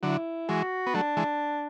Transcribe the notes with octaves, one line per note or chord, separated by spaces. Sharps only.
D3 F#3 E4
E3 G#3 F#4
B3
F#3 A3 D4
E3 G#3